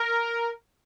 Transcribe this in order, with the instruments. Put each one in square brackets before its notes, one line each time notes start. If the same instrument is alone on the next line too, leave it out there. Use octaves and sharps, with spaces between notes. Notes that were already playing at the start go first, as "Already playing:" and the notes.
Already playing: [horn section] A#4